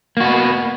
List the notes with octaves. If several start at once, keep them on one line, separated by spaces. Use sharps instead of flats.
A#3 B3 F#4